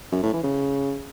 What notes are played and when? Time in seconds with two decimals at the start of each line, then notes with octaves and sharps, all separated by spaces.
0.12 F#2
0.23 A2
0.33 E3
0.44 C#3